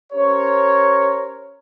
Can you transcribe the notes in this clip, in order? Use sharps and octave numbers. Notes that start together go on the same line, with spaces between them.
C#4 G4 A#4 C5 C#5